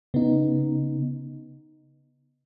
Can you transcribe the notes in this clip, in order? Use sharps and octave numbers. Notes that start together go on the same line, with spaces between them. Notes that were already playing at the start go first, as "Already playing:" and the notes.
C#3 B3 D#4